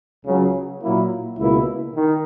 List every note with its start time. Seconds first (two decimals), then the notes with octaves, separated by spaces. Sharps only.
0.24 C#2 C#3 F#3
0.81 A#2 F#3 A#3 E4
1.38 C#2 B2 A#3 E4
1.96 D#3